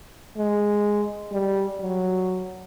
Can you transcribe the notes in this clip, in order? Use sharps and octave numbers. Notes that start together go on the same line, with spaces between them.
G#3
G3
F#3